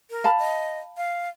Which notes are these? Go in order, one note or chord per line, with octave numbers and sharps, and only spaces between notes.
A#4
F5 A5 B5
D#5
F5